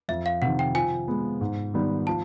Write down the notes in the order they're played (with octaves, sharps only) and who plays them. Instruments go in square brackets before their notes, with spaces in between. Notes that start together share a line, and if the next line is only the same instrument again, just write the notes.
[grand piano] F2 [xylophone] E5
[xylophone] F5
[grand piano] C3 D#3 [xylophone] F#5
[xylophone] G5
[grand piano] F3 [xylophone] G#5
[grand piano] G#3 B3
G#2
D#3 G3 B3
[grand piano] F3 [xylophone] A5